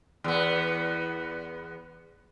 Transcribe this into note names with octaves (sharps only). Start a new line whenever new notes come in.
E2 B3